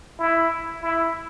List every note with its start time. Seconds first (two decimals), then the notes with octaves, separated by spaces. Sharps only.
0.19 E4
0.81 E4